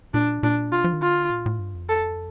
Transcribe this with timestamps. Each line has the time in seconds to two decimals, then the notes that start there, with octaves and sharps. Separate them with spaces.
0.14 A#2 D4
0.43 A#2 D4
0.72 C3 F4
0.84 F3
0.93 D#3
1.02 D3 F4
1.31 A#2
1.46 A2
1.59 G2
1.74 F2
1.89 A4